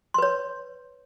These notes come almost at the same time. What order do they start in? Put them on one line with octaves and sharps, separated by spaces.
C6 B4 C#5